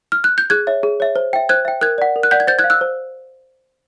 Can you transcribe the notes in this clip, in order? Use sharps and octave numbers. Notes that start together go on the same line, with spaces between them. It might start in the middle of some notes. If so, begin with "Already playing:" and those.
F6
F#6
G6
G#4 F#6 G#6
C#5 E5
G#4
C#5 E5
C5
E5 G5
C5 F#6 G#6
E5 G5
A#4 F#6 G#6
D5 F#5
A#4
F#6
D5 F#5 G6
G#6
C5 G6 A6
F#6 G#6
F5
E6 F#6
C5